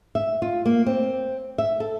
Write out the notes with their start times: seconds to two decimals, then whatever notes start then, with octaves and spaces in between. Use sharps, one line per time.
0.15 E5
0.42 F4
0.66 A#3
0.86 C4
1.58 E5
1.80 A4